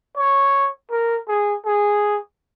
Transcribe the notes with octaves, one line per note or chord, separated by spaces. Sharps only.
C#5
A#4
G#4
G#4